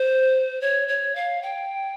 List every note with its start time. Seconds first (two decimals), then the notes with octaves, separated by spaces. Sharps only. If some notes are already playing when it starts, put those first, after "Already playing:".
Already playing: C5
0.61 C#5
0.88 C#5
1.15 F5
1.42 G5